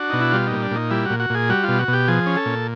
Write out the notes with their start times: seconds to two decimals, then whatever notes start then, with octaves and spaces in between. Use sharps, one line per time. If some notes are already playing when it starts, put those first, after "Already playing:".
Already playing: D4 F#4
0.10 B2 D#4
0.21 E4
0.32 G3 F4
0.47 A#2 D#4
0.62 D4
0.71 A#2 D#4
0.90 G3 E4
1.06 A#2 F#4
1.20 F#4
1.30 A#2 G#4
1.50 G3 F#4
1.63 B2 F4
1.79 F#4
1.88 B2
1.93 G4
2.08 F3 G#4
2.26 C#4
2.37 A4
2.46 A#2